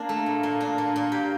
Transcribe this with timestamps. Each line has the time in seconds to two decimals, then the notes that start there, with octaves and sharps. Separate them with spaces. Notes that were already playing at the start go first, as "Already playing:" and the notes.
Already playing: A#3 D4
0.09 A3
0.26 A#2
0.43 A#2
0.61 D4
0.78 A#2
0.96 A#2
1.12 G4